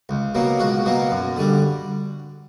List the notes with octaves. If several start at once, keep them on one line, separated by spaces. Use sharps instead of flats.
C#2
B2 F#3 A#3
C#2 F#4
B2 F#3 A#3
F#2
D3 G3